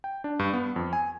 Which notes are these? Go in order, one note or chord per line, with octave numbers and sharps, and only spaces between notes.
G5
D4
G2
B3
F2
G#5